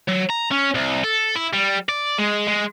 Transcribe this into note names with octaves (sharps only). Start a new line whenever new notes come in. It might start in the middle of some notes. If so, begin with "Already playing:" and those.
F#3
A#5
C#4
C2
A4
E4
G3
D5
G#3
G#3